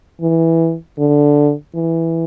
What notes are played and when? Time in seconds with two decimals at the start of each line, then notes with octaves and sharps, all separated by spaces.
0.21 E3
0.99 D3
1.75 E3